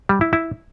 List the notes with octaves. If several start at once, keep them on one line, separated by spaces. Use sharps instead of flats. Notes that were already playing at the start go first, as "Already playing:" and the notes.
G3
E4
E4